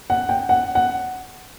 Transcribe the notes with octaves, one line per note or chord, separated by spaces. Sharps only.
F#5
G5
F#5
F#5